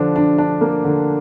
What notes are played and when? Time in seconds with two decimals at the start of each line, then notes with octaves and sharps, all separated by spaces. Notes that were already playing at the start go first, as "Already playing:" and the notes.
Already playing: D3 F3 D4
0.16 D4
0.38 D4
0.61 A#3
0.84 D3